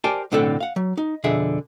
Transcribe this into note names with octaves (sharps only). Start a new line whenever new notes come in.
G4 A#4 C5 D5 G#5 A5
B1 A2 D3 C4 A4 F#5
F5 F#5
F#3
D#4
F2 B2 D3 G#4 E5